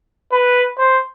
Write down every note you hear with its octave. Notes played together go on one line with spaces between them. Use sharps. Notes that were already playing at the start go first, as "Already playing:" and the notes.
B4
C5